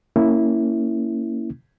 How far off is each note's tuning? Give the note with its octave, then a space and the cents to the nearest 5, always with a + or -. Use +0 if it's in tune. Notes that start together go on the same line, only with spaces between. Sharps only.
A#3 -20 C#4 +0 E4 -5